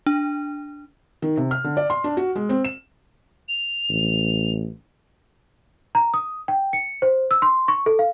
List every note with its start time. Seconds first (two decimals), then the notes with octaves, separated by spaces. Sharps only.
0.06 D4
1.22 D#3
1.37 C3
1.51 F6
1.64 D3
1.77 D5
1.90 C6
2.04 D4
2.17 F#4
2.36 G#3
2.49 C4
2.65 E7
3.49 F7
3.89 A1
5.95 A#5
6.14 D#6
6.48 G5
6.73 C#7
7.02 C5
7.31 E6
7.42 C6
7.68 C#6
7.86 A4
7.99 F5